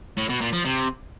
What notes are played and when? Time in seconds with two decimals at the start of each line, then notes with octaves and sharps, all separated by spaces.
0.17 A2
0.29 B2
0.41 A#2
0.53 F3
0.65 C3